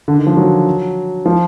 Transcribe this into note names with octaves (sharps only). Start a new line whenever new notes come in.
D3
D#3
F3
F#3
F3